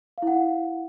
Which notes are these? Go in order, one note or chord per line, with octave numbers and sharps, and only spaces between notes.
E4 F5 F#5